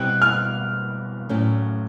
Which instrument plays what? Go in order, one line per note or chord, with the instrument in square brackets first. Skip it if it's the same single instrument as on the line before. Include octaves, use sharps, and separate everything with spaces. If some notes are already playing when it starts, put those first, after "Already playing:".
Already playing: [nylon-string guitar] B2 G3 C4 E4 G4 [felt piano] F#6
[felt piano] F6
[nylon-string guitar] A2 F#3 A3 C#4